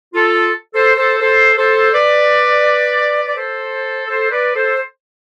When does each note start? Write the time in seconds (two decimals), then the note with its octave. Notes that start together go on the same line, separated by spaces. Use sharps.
0.14 F4 A4
0.74 A4 C5
0.97 A4 C5
1.21 A4 C5
1.57 A4 C5
1.93 B4 D5
3.26 D5
3.36 A4 C5
4.07 A4 C5
4.31 B4 D5
4.55 A4 C5